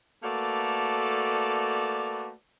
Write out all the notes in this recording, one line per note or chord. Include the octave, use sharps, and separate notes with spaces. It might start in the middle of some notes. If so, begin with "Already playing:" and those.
A3 A#3 F#4 A4 B4 D5